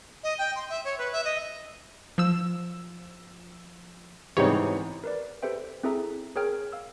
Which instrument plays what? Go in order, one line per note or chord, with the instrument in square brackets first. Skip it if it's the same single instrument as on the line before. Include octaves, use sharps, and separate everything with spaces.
[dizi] D#5
G5
C6
E5
C#5
B4
E5
D#5
[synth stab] F3 E6
[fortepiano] G#2 C3 G3 [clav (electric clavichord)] E3 B3 D#4 [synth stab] C#5
[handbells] A#4 B4 D5
G4 A4 B4 C5 E5 G5
C4 E4 G#4 A4 E5 A#5
G#4 A#4 C#5 G5 F6
F5 E6